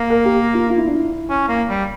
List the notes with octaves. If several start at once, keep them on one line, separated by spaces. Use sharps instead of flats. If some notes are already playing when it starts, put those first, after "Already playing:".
Already playing: A#3
A#4
G4
F4
F4
E4
D4
E4
C#4
A#3
G3